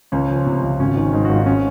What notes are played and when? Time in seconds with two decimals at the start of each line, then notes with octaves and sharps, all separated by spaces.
0.12 C#2 C#4
0.30 F3
0.46 C3
0.62 C#2
0.79 G#1 C#4
0.96 D#3
1.13 G#2
1.25 F#4
1.29 G#1 F4
1.39 D#4
1.46 C#4